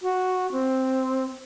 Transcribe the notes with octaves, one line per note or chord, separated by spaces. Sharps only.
F#4
C4